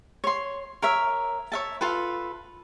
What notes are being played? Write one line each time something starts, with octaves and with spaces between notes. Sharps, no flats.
C#5 C6
A#4 C#5 E5
C#5 E5 A5
F4 A4 B4